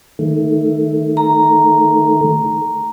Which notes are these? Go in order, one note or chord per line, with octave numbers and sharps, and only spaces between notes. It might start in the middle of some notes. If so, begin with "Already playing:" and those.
D#3 A3
A#5